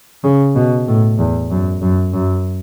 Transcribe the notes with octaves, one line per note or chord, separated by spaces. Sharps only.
C#3
B2
A2
E2
F#2
F#2
F#2